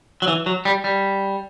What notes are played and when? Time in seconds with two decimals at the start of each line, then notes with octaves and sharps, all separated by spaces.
0.22 F#3
0.28 E3
0.46 F#3
0.65 G3
0.84 G3